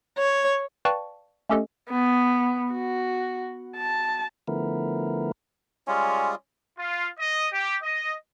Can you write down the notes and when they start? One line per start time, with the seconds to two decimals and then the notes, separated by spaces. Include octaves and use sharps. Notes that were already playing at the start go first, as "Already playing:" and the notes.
0.18 C#5
0.85 B4 D5 F5 G5 A5 C#6
1.49 A3 C#4 G4 A4 D#5
1.90 B3
2.72 F#4
3.77 A5
4.48 D3 F3 A3 B3 E4 A#4
5.88 G3 G#3 C#4 F4
6.78 F4
7.20 D#5
7.52 G4
7.83 D#5